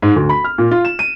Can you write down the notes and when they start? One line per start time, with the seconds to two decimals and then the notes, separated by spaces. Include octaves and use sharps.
0.02 G#2
0.16 D2
0.29 B5
0.44 F6
0.58 A#2
0.71 F4
0.85 E7
0.99 D#7